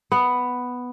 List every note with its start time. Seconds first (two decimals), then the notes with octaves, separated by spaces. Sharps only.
0.12 B3